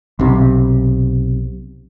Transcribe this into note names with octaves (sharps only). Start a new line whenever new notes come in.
B1 C3